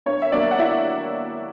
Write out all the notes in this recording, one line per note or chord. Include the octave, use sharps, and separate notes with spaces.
G2 C#5
E5
F#3 A#3 D4 D5
F#5
E4 E5